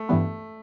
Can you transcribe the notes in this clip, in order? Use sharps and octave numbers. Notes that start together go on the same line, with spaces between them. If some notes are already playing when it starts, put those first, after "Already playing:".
Already playing: A3
G2 E3 G3 B3